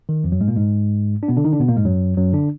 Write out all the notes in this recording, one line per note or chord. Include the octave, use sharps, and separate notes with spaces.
D#3
F2 F3
F#2 F#3
G#2 G#3
A#2 A#3
G#2 G#3
D4
B2 B3
D3 D4
D#3 D#4
D3 D4
B2 B3
A#2 A#3
G#2 G#3
F#2 F#3
F#2 F#3
D3 D4